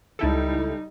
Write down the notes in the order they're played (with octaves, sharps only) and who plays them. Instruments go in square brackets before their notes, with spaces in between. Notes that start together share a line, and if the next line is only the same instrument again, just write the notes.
[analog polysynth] C#2 E4 A4 [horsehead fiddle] G3 D#4